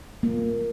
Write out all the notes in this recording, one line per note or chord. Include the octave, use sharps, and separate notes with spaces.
A#3